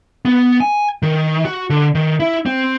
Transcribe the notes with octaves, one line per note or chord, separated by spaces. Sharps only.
B3
G#5
D#3
F#4
D3
D#3
E4
C4